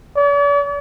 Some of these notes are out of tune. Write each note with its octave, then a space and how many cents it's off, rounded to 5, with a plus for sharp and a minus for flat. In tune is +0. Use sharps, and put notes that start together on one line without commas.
D5 -45